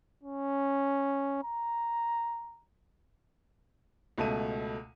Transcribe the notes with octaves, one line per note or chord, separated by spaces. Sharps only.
C#4
A#5
C#2 B2 A3 A4 E5 D#7